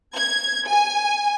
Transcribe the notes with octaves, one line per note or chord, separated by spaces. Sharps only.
G#6
G#5